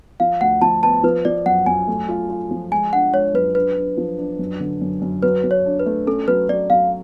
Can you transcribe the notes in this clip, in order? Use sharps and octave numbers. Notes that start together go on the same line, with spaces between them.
F3 F5
D2 F#5
F3 A5
B3 A5
F3 B4
F3 D5
F#2 F#5
F#2 G#5
A3
F4
F4
F3
G#3 G#5
D4 F#5
G#3 C#5
F#2 B4
D4 B4
D4
F3
D4
F#2
D3
F#2
F#2
F#3 B4
F#3
C#5
D4
B4
A3
C#4 A4
F#3 B4
F#3 D5
F#3 F5